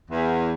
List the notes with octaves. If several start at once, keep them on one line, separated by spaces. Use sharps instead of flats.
E2